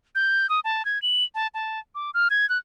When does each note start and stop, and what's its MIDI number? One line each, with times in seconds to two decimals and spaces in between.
0.15 0.49 91
0.50 0.60 87
0.64 0.85 81
0.85 1.01 92
1.02 1.24 102
1.35 1.47 81
1.54 1.79 81
1.95 2.11 86
2.14 2.28 89
2.30 2.48 92
2.49 2.58 90